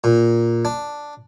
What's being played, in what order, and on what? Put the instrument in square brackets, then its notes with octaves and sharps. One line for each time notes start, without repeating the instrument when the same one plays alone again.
[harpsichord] A#2
D4